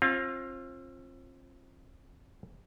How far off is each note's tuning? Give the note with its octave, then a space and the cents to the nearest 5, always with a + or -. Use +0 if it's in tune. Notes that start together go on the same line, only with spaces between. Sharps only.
C4 +35 F4 +0 F5 -5